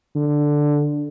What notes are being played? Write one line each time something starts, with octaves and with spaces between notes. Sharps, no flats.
D3